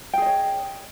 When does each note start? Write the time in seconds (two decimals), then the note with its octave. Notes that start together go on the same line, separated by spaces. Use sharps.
0.14 G5
0.18 G#4
0.22 D#5
0.26 C#5